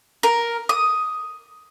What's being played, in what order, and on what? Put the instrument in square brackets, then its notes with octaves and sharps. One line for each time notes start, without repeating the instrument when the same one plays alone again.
[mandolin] A#4
D#6